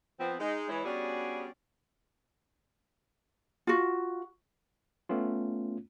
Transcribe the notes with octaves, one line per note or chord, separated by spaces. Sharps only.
F3 B3 C4
G#3 D#4
E3 G#3 E4 G#4 C#5
G3 B3 C#4 D4 F#4 G#4
F4 F#4
A3 B3 C#4 F4